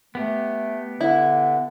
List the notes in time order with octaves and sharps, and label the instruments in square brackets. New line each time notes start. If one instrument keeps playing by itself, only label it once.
[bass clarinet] A3 [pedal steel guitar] B3 G4
[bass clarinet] D3 [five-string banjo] E4